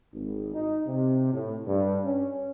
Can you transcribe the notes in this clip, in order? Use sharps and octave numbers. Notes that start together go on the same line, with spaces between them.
G#1
D#4
C3
A2
G2
C#4